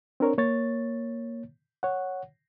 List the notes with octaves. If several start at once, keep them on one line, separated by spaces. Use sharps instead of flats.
C4 D4 A#4 C#5
A#3 C#5 A6
C#5 F#5